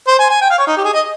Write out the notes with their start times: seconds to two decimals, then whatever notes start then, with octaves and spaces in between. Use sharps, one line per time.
0.07 C5
0.19 G#5
0.30 G#5
0.41 G5
0.50 F5
0.58 C#5
0.67 D#4
0.77 G4
0.84 G#4
0.94 D#5